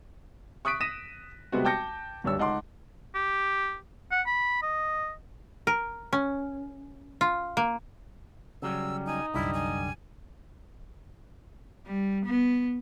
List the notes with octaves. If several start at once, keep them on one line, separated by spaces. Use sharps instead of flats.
C#6 D#6 F#6 B6 D7
D#6 A#6 B6 D#7 E7
C3 G3 G#3 B3 C4 F#4
G5 A5 D6 G6 A#6 C#7
D1 G2 D4 C#5 E6
C#2 D#4 F#5 A5 C6 D6
G4
F#5
B5
D#5
A#4
C#4
F4
A#3
C#3 F#3 G3 E6
D#4 G#5
C2 F#2 D3 G3 E4
G#5
G3
B3